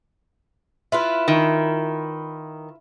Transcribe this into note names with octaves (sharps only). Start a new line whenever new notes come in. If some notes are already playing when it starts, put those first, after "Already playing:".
E4 F4 B4
D#3